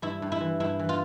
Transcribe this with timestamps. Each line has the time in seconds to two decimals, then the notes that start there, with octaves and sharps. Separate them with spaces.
0.02 G2 E4
0.22 G2
0.32 E4
0.41 E3
0.60 G2 E4
0.79 E3
0.89 F4